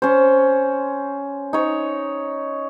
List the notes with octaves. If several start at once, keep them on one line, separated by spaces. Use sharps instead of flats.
C#4 C5
D#4 C#5